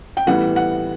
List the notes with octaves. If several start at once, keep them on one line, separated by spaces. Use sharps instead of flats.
G5
A2 E3 G3 B3 F#5
F#5